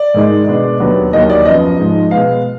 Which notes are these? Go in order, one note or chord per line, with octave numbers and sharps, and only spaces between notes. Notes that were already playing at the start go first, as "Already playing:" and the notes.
Already playing: D5
G#2 D#3 G#3 D#4
B2 G#3 D4
D#2 D3 F#3 B3 D4
D#2 D#3 F#3 A#3 D#4 D#5
D5
F#2 F3 B3 D#5
G#2 F3 G#3 D#4
B2 G#3 B3 F5